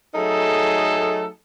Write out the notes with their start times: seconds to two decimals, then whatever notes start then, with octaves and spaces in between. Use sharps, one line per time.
0.15 F#3 A3 D#4 G#4 A4